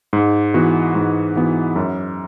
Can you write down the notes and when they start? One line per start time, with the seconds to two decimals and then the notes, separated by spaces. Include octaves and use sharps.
0.13 G#2
0.54 E3 B3 F#4
0.95 G#2
1.36 E3 B3 F#4
1.76 F#2